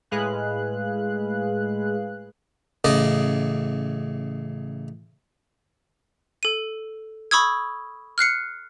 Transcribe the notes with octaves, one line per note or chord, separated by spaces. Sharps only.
A2 G#3 G#4 B4 F5 F#6
A1 C#3 D5 D#5
A4 D#7
B5 C#6 D#6 E6 G#6
F6 F#6 C7 C#7